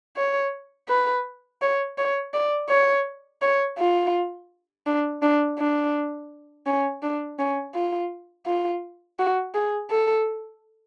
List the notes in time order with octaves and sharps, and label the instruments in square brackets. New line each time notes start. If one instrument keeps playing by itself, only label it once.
[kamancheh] C#5
B4
C#5
C#5
D5
C#5
C#5
F4
D4
D4
D4
C#4
D4
C#4
F4
F4
F#4
G#4
A4